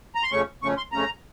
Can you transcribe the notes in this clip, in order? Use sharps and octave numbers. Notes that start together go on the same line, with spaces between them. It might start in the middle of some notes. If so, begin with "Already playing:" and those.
A#5
C6
F2 C#3 A3 C#4 C#6
F2 C#3 A3 C#4 C#6
C6
F2 C#3 A3 C#4 A#5